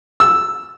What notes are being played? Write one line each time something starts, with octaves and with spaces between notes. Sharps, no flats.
E6